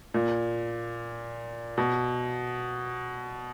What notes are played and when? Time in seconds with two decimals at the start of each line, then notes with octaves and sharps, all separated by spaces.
0.14 A#2
1.78 B2